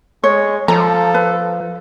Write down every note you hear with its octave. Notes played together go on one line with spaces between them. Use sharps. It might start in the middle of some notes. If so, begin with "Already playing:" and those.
G#3 C#5
F3 A4 A#5
B4